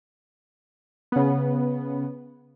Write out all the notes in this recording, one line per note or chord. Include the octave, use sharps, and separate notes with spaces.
C#3 B3